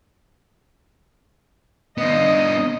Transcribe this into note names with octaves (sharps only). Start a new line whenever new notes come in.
B3 D4 D#5